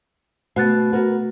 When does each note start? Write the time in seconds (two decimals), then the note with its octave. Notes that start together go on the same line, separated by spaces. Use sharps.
0.56 B2 A3 B3 F#6 A6
0.93 F#4 A#4 B4